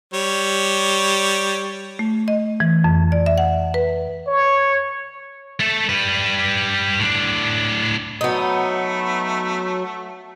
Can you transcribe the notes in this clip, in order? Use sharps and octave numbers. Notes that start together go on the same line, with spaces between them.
G3 C#5
A3
D#5
E3
F2
D5
E5
F#5
B4
C#5
A3 A4
G3 B4
A2 D4
F#3 A3 B3 D#4